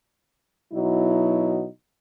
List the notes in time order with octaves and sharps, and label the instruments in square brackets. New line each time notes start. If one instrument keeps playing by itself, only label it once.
[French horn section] B2 F#3 D#4 E4